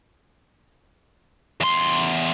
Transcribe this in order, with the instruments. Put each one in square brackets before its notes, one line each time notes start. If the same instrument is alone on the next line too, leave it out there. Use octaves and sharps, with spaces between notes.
[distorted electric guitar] E2 C6